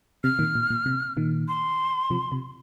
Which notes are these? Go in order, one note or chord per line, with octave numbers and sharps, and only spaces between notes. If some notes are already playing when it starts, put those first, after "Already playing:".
C3 F6
A#2 D#3
A#2
A#2
C3
A#2 D#3
C6
C3 F3
C3